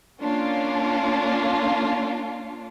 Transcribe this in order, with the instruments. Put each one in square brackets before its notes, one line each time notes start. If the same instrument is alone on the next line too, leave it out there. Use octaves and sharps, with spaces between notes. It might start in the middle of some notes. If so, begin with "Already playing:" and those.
[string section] A#3 C#4 D4 F4